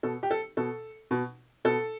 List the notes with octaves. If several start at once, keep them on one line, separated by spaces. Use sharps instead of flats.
B2 A4
G4
A4
B2 A4
B2
B2 A4